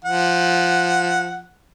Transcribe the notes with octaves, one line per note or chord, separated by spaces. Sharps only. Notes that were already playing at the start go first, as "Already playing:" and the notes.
F3 F#5